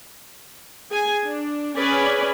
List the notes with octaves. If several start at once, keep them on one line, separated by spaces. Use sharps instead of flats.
G#4 G#5
D4
C#4 G#4 B4 D5 G#5 B5